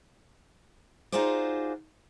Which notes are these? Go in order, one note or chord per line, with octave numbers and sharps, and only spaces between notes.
D#4 F4 F#4 G#4 C5 D5